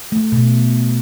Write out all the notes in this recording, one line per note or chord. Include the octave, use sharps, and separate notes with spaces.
A3
B2